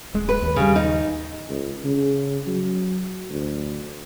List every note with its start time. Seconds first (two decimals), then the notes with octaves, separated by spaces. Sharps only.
0.14 D#1 G#3
0.29 B4
0.42 D#2
0.56 C#3 G3
0.76 D#4
1.48 C#2
1.84 C#3
2.47 F#3
3.30 D2